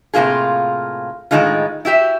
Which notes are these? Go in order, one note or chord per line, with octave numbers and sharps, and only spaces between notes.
A2 C3 A#3 F4 G#4
A2 D#3 G#3 D#4 F4
E4 F#4 G4 E5